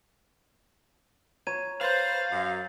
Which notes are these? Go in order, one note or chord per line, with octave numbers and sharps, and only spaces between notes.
C#5 A#5 C6 G#6 D#7
B4 C5 F5 G6 A6 F#7
F#2